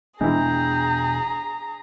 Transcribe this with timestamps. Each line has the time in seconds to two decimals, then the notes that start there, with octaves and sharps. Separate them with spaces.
0.21 E1 B2 E3 G#3 D4 G#4 G5 A#5